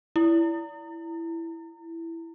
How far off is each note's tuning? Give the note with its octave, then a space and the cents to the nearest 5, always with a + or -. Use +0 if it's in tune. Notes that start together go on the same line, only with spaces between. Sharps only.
E4 +10